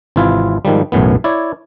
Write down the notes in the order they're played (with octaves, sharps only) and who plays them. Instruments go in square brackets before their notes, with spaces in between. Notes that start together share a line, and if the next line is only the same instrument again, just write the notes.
[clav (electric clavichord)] G#1 C3 E3 E4 F4
G#2 D#3 F3 G3
B1 F#2 A2 E3 B3
E4 C#5 D5